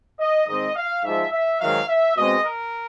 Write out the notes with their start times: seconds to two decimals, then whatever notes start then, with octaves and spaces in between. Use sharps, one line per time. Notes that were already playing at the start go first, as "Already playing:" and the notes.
0.19 D#5
0.47 G#2 D#3 G#3 C4 D#5
0.75 F5
1.03 G#2 F3 G#3 E5
1.32 E5
1.60 G#2 D#3 F#3 F5
1.88 E5
2.16 B2 G#3 C4 D#5
2.45 A#4